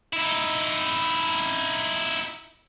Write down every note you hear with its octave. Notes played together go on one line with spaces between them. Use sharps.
D#4 E4